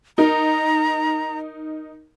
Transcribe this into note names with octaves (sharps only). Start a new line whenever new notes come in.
D#4 A#4 A#5